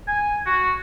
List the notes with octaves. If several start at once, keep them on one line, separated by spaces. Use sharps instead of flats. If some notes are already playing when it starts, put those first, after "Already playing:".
G#5
F#4